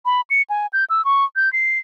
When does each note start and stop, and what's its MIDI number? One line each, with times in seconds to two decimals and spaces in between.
0.06 0.21 83
0.30 0.42 97
0.50 0.67 80
0.73 0.85 91
0.90 1.04 88
1.05 1.25 85
1.36 1.52 91
1.53 1.79 96